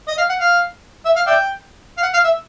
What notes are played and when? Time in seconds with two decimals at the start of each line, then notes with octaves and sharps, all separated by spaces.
0.08 D#5
0.18 F5
0.29 F#5
0.40 F5
1.05 E5
1.16 F5
1.27 D5 E5 G5
1.98 F5
2.03 F#5
2.14 F5
2.24 E5